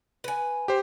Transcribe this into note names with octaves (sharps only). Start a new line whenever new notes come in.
B4 G#5
G4 C5